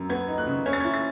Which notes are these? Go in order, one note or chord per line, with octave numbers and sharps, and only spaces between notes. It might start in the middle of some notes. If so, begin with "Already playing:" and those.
Already playing: F#2
B3 G#6
D#4
F#6
C#3
C#4 G#6
A6
G#6
E4
A6